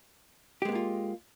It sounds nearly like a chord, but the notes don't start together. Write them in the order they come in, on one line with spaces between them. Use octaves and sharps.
G4 G#3 B3 A#3 F4